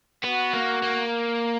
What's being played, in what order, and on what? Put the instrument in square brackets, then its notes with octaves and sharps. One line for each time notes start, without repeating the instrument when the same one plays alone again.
[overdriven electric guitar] B3 [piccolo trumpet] F#4
[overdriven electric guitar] A#3
A#3